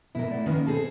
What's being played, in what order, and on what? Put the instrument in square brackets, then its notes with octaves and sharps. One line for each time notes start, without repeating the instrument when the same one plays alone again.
[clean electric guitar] B2 B3 A#4 [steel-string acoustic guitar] E4
[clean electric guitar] A3 D5 F#5
[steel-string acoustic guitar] D#3 A#3 [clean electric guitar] C#4 B4 B5
[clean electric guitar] B2 [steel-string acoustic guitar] C4 G#4 A4